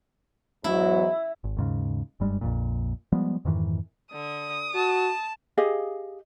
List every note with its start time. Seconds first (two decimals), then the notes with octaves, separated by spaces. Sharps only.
0.64 E2 G#2 F#3 E4
1.44 G#1
1.57 D#2 G#2 C#3
2.20 F#1 G2 G3 G#3
2.41 A#1 F2 A#2
3.12 F3 G3 G#3 B3
3.45 F2 G#2 D#3 E3
4.12 D3 D#6
4.75 F#4 A5
5.58 G4 G#4 D#5 F5